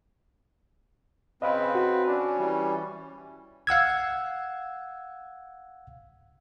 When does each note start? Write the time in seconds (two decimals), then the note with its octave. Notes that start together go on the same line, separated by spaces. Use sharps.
1.42 C#3 C4 B4 D#5 F5 B5
1.75 F#4
2.07 C#4 D4
2.38 E3 G3
3.67 F5 F#5 E6 G#6